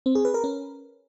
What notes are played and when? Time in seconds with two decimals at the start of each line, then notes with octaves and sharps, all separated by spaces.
0.06 C4
0.15 G#4
0.25 B4
0.34 A#4
0.44 C#4